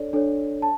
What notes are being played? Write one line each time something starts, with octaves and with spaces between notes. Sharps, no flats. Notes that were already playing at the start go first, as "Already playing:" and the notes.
Already playing: D4 A4 C#5 D5
D4 A4 C#5
A5